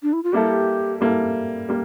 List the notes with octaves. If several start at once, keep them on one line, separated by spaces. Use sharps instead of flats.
D4
E4
F4
G3 A#3 E4 G4 A4
G3 A#3 E4 A4
G3 A#3